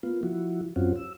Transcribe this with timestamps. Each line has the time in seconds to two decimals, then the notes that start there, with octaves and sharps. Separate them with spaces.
0.03 A#3 B3 F4
0.23 F3 E4 F#4
0.76 F#2 C4 C#4 F4 F#4
0.96 E6